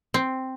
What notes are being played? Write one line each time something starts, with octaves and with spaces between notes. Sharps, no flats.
C4